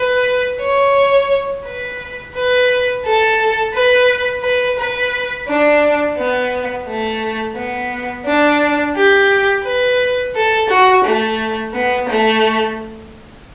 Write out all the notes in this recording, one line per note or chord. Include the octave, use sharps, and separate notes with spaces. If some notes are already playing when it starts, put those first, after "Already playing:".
Already playing: B4
C#5
B4
B4
A4
B4
B4
B4
D4
B3
A3
B3
D4
G4
B4
A4
F#4
A3
B3
A3